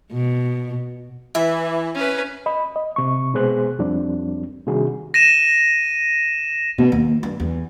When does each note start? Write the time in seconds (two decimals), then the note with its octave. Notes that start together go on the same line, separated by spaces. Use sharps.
0.12 B2
1.35 E3 E5
1.95 C#4 B4
2.46 D#5 B5
2.76 D#5
2.96 C3 C#6
3.34 B2 G#3 B3 G#4 C5 F#6
3.79 F2 F3 G3 C4 D4
4.67 C3 D#3 G3 D4 F#4 G#4
5.14 A#6 D#7 E7
6.78 B2
6.92 D#2
7.23 G2
7.40 E2